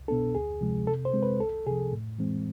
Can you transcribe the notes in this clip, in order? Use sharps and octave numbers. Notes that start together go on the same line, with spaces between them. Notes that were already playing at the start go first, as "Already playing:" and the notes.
Already playing: C2
B2 B3 D4 A4
D2 G#4
C3 F3 G#3
C3 A4
C5
G#3 C4
B4
C2 A4
C3 F3 G#4
A2
E3 G#3 C4